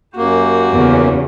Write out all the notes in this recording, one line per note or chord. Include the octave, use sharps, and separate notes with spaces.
F#2 A#3 F#4 G4
E2 C#3